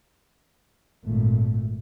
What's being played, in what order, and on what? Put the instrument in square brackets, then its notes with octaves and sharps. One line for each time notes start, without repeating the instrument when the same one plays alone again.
[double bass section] G#1 A#2 A3